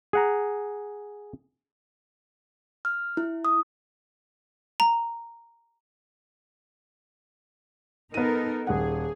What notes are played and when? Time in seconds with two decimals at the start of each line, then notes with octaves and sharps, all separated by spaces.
0.13 G#4 F#5 A#5
2.85 F6
3.17 E4
3.45 D#6
4.80 A#5
8.14 B3 D#4 A4 A#4 D#7
8.67 D#1 G#4 F#5